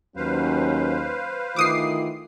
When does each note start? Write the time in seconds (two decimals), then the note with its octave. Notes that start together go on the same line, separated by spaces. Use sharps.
0.16 D#2 F#3 C#4 B4 C5 F5
1.56 D#3 E3 A3 F4 D6 D#6 C7